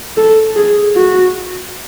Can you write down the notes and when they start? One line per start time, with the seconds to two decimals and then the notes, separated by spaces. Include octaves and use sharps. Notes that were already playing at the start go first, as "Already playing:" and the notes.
0.17 A4
0.56 G#4
0.95 F#4